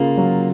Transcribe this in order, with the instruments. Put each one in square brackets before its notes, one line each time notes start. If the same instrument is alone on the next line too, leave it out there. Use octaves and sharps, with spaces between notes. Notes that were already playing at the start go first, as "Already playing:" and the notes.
Already playing: [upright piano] C#3 F4 [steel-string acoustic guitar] A#3
[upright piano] F#3